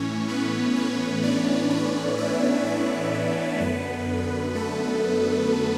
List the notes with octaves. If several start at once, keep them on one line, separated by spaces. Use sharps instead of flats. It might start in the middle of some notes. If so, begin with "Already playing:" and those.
Already playing: A2 E3 C#4 C#5
B3 B4
C#4 C#5
D4 D5
D4 D5
E4 E5
C#4 C#5
F#2 D3 B3 B4
A3 A4